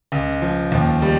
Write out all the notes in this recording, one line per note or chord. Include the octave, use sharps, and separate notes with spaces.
C#2
F3
D#2
G3